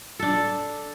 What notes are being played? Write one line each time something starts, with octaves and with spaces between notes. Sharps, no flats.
D4 A4